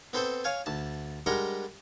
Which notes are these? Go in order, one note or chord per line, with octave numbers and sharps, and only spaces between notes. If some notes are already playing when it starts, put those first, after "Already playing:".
B3 C4 A4 C5
C#5 F5 G#5
D2 A5
G3 G#3 D4 A#4 F#5